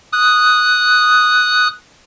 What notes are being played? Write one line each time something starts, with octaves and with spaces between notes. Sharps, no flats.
D#6 F#6